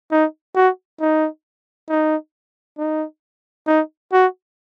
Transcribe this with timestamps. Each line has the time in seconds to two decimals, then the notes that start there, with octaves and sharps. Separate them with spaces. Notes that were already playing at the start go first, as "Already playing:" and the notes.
0.11 D#4
0.55 F#4
1.01 D#4
1.89 D#4
2.78 D#4
3.67 D#4
4.13 F#4